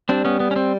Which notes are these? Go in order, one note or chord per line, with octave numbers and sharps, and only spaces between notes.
G3 C4 D4
B3 C#4
B3
C#4
C4